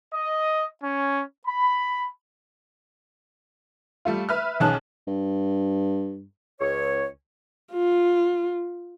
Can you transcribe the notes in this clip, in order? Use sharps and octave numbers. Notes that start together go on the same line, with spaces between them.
D#5
C#4
B5
G3 A3 F4
B4 E5 F6
B1 D#3 C#4 G#4 A5 F#6
G2
C#2 C#5
F4